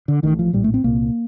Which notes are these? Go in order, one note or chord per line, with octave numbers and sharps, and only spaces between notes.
D3
A1 A2 D#3
F3
A#1 A2 G3
A3
C4
C2 A#2 A#3